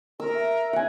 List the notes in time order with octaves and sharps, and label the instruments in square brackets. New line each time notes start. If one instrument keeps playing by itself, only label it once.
[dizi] A#4 [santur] E6
[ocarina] E5
[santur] F#5 G#5